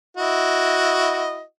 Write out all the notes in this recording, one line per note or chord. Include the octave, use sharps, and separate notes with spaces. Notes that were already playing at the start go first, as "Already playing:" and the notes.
E4 F#4 D#5